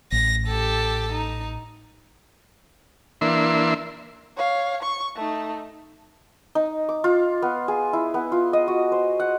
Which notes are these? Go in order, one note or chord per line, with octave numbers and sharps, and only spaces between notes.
A1 A#6
G4 A4
D#4
E3 A#3 D4 E5 C6
C#5 F5
C#6
A3 D#4
D#4
D6
F4
B3
G#4
E4
B3
F4
D#5
F#4
C5
F#5